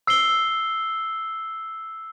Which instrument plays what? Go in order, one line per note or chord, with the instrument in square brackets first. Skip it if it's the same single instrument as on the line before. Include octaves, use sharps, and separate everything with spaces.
[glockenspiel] E6 C7 G7